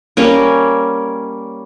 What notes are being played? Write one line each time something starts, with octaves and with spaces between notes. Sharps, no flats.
G3 A#3 C#4